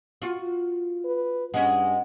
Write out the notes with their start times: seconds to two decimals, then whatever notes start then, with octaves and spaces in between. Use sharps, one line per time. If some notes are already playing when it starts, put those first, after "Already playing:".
0.22 F4 F#4
1.05 B4
1.54 G2 G#3 C#4 F#5